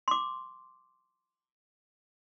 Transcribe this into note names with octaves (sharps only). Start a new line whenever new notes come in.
C6 D6